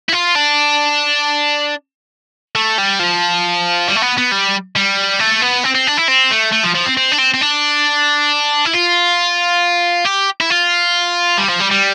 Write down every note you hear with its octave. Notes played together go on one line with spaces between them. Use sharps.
E4
F4
D4
A3
G3
F3
G3
A3
B3
B3
G3
G3
A3
B3
C4
C4
D4
E4
C4
A3
A3
F3
F3
C4
C4
D4
C4
C4
D4
E4
F4
G4
E4
F4
G3
F3
G3
G3